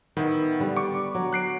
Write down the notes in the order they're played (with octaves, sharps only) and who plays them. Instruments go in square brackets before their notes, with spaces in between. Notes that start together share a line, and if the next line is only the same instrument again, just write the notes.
[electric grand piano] D#3 [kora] B3 E4
[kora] D3 G3
[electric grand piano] C#6 D6
[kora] F#3
[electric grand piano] F#6 C7 D7